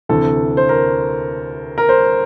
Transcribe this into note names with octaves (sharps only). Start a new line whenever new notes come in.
D2 C3 E3 A4
C5
A#4
A#4
C5